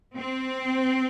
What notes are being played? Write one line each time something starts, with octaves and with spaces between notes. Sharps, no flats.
C4